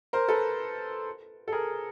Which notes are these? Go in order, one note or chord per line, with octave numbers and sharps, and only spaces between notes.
A#4 C5
A4 B4
A4
G#4 A#4